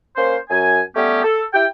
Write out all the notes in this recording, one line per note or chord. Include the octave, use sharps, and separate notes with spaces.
A#3 C#4 C5
F#2 G#5
G3 A3 B3 C#4 G4
A4
E4 G4 G5